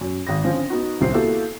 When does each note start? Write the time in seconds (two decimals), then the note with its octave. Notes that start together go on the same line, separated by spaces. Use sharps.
0.01 F#2
0.27 G#1 D#6 A#6
0.44 D3 F3 C4 C#4
0.70 B3 D#4 F#4
1.01 D#1 C2 C4 C7
1.13 A#3 B3 E4 F#4 G4 A4